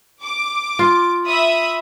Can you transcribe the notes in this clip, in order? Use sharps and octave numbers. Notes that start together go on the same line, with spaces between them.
D6
F4
E5 B5 D#6